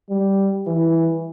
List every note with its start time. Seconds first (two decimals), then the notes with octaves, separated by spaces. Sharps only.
0.09 G3
0.66 E3